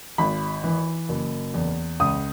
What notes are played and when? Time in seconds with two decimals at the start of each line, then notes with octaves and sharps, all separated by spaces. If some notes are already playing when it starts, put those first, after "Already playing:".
0.18 G#1 B5
0.64 E3
1.09 F#1
1.54 E2
2.00 C#2 D#6